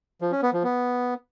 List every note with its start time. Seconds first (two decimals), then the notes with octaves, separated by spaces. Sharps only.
0.21 F3
0.32 C#4
0.42 B3
0.53 F3
0.63 B3